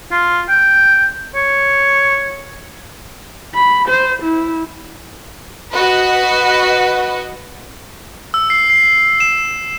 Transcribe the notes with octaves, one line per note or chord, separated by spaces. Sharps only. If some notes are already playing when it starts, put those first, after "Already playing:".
F4
G5
C#5
B5
C5
E4
F#4 B4 D#5
E6
C7
C7
E7